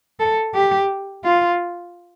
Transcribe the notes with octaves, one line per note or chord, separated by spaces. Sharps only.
A4
G4
F4